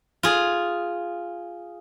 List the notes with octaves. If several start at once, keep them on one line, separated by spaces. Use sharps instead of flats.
F4 G#4